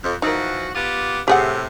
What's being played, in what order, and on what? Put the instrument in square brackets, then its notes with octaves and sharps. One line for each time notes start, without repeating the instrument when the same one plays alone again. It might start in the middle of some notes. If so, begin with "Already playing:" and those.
[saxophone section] F2
[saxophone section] E3 F3 F#4 [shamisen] D#4 A#4
[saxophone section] B3 F4 G4
[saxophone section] A2 C3 [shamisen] G4 G#4 F#5